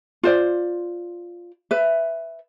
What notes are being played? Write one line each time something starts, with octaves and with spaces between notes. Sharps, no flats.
F4 C5 D5
B4 E5